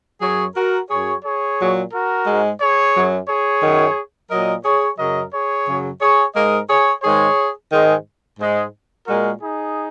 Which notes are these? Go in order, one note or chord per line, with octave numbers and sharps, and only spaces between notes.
F#2 F#3 G#4 C#5
F#4 A#4
F#2 F#3 G#4 C#5
G#4 C#5
A#2 F#3
F#4 A#4
G#2 G#3
G#4 C#5
F#2 F#3
G#4 C#5
F#2 D#3 F#3
A#2 F#3 A#4 D#5
G#4 C#5
F#2 C#3 F#3 A#4 D#5
G#4 C#5
F#2 C#3 F#3
G#4 C#5
G#2 G#3 A#4 D#5
G#4 C#5
G#2 D#3 G#3 G#4 C#5
G#2 D#3 G#3
G#2 G#3
A#2 G#3 F#4 A#4
D#4 G#4